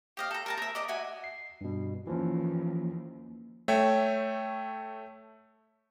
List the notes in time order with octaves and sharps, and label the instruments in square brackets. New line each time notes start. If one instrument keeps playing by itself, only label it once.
[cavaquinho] G4 D#5 F5
A4 A#5
A#4 A5 A#5
A#4 E5
D5 D#5 A#5
F#4 E5 G#5
[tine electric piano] C7
G2 B2
[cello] D#2 [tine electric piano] E3 F3 C#4
[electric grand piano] A3 C#5 E5 G5